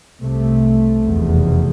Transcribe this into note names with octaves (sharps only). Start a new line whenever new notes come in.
C2 C3 A3
F1 E2 B2